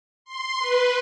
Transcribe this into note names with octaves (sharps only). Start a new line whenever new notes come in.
C6
B4